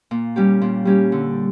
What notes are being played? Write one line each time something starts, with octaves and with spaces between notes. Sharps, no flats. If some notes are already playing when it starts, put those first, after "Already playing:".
A#2
G3 C#4 G4
A#2
G3 C#4 G4
D3